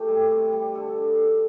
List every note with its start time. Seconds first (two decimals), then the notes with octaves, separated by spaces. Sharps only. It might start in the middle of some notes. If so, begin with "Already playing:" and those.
Already playing: A3 G4
0.08 G3
0.31 C3
0.53 G3
0.75 D3 A4
0.98 D3